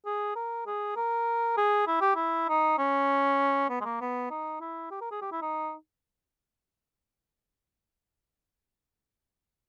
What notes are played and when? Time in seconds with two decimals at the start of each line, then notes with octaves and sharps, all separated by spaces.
0.06 G#4
0.35 A#4
0.66 G#4
0.96 A#4
1.57 G#4
1.87 E4
2.01 G4
2.16 E4
2.49 D#4
2.78 C#4
3.70 B3
3.81 G#3
3.85 A#3
4.01 B3
4.30 D#4
4.61 E4
4.91 G4
5.01 A#4
5.11 G#4
5.21 G4
5.32 E4
5.42 D#4